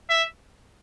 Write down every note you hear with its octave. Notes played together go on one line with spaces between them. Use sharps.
E5